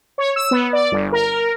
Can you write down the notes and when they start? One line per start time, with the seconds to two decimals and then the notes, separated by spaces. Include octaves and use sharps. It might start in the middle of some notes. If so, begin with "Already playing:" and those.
0.18 C#5
0.36 E6
0.51 B3
0.73 D5
0.92 G1
1.12 A#4